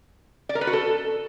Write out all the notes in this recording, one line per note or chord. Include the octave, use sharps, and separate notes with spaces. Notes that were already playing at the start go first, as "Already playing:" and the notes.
D5
A#4
B4
F#4
A4